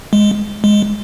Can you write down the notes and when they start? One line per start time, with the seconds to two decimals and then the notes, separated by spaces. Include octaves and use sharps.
0.13 G#3
0.64 G#3